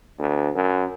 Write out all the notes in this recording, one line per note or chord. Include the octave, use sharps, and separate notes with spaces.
D2
F#2